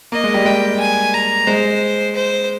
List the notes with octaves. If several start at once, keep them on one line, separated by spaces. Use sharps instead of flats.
A#3 D#5
G#3
G3
G#3 G5
G#5
A#5
G#3 C5
C5